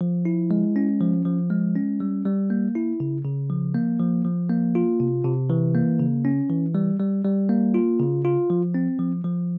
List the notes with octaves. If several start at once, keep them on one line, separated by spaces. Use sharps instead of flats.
F3
E4
G#3
C#4
F3
F3
G#3
C#4
G3
G3
A#3
E4
C#3
C#3
F3
A#3
F3
F3
A#3
F4
C3
C3
E3
A#3
C#3
C#4
E3
G3
G3
G3
A#3
F4
C#3
F4
F3
C4
F3
F3